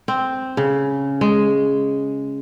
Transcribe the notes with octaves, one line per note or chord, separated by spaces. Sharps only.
C4
C#3
G#3